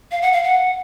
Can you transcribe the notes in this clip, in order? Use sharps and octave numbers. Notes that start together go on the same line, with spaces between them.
F5
F#5
F5
F#5